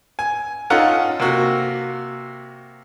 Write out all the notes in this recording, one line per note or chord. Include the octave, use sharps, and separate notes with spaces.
G#5
C#4 D#4 F4 A4 F#5 A#5
C3 A#3 F#4